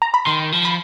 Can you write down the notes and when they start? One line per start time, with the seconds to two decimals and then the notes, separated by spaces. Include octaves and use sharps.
0.02 A#5
0.14 B5
0.26 D#3 C6
0.52 F3
0.65 B5